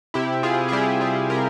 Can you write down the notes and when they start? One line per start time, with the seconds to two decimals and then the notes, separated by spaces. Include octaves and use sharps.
0.14 C3 E4 G4
0.43 C3 F4 G#4
0.68 G#4
0.72 G3 E4 G4
1.01 G3 F4 G#4
1.30 C3 G4 A#4